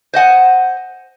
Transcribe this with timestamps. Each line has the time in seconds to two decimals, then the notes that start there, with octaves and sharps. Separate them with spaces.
0.13 C5 D#5 F#5 G#5